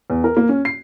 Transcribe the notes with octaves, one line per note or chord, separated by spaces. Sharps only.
E2
A#4
A#3
C#4
C7